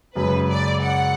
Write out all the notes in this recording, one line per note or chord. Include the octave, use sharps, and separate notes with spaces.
F#2 C#3 G#3 B4
D5
F#5